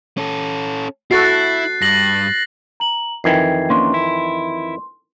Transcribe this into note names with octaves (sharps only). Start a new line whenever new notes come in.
C#4 A4
E4 F#4 A4 F#6 A6 C7
G2 A#6 F#7
A#5 F#7
F2 D#3 E3 G5 G#6 C7
A#3 C#4 D4 C6
E4